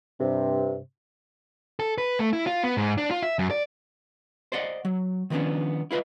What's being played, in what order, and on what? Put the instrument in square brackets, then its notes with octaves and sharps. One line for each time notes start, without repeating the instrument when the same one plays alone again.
[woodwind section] G2 C3
[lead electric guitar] A4
B4
A3
E4
F4
B3
G#2
D4
F4
E5
F#2
D5
[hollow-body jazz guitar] C5 D5 D#5 F#5
F#3
D#3 F3 A#3 B3 C#4 D4
E4 F4 B4 D#5 E5